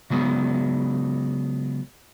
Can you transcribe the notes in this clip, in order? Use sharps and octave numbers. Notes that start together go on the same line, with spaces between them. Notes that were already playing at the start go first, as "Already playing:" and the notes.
C#3 F#3 G#3 B3